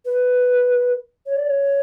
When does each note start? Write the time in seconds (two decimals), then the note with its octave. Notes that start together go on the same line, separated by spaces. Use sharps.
0.05 B4
1.26 C#5
1.36 D5
1.46 C#5